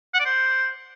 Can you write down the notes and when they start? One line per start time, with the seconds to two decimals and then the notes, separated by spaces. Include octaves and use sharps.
0.14 F#5
0.20 D5
0.25 C5